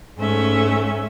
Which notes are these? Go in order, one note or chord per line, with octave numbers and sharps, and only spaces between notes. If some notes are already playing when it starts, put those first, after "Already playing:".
G#2 A3 C#4 E5